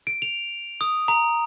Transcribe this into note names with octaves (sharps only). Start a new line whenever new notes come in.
D7
F7
D#6
A#5